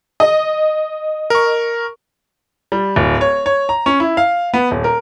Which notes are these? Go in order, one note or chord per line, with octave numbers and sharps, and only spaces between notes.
D#5
A#4 C#6
G3
D1
C#5
C#5
A#5
C#4
E4
F5
B3
D#1
A#4